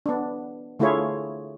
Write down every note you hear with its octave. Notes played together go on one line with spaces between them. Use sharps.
B3 D4
D3 A3 E4 F4 G#4 C#5